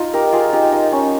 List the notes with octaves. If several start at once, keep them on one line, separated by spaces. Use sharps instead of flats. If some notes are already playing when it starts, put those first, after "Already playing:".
Already playing: D#4 F4
G4 A#4
F4 G#4
D#4 G4
D#4
C#4